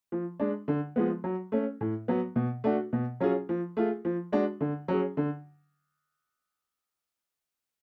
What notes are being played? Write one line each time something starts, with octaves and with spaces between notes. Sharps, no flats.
F3
G#3 D4
D3
F3 G#3 B3
F#3
A3 C#4
A2
F#3 B3
B2
A3 D4 F#4
B2
F#3 C#4 F4 G#4
F3
A3 F4 G#4
F3
G#3 D4 F#4
D3
F#3 C#4 G#4
D3